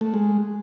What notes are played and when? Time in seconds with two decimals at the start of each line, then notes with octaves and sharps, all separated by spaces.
0.01 A3
0.14 G#3